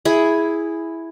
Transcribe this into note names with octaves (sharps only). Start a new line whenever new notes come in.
E4 G#4